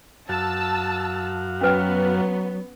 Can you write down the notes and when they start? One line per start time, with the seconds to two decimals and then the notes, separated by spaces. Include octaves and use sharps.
0.29 F#2 F#4 F5 A5 E6
1.61 F#3 B3 C#4 B4 G5